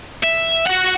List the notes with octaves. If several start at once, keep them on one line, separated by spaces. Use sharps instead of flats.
E5
F#4 F#5